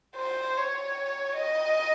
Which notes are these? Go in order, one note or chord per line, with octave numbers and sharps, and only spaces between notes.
C5
C#5
D#5